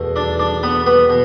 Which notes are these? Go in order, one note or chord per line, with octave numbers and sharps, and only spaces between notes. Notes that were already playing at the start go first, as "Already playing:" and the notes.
Already playing: E2 B2 A3
D4 D5
D4 D5
B3 B4
B3 B4
B2